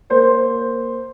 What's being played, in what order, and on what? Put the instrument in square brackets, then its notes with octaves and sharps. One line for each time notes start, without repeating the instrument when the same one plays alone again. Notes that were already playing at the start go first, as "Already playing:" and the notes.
[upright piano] A#3 C5